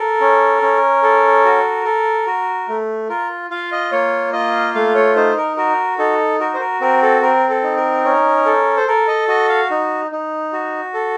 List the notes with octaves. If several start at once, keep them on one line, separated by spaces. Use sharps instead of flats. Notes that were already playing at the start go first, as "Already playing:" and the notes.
Already playing: A4 A#4
C#4
C#4
A4
F#4
A4
F#4
A3
F4 A#4
F4 F5
D#5
A#3 C#5
F4 D#5
A3 F5
C#5
D#4 C5
A#4
F#4 A#4
D#4 A4
F#4 A#4
C5
A#4
C4 A#4
A4
C4 A#4
A4
D#4
A#4
C#4
A4
C5
A4 A#4
D#5
F#4 D#5
F5
D#4
D#4
F#4
A4